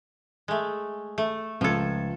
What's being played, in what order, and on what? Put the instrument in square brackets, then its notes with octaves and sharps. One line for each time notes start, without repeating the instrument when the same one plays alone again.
[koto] G#3 A3
A3
[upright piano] C#2 G#6 [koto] F3 A4